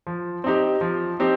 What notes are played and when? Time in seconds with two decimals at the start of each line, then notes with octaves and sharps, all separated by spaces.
0.07 F3
0.44 C4 D#4 G4
0.81 F3
1.19 C4 D#4 G4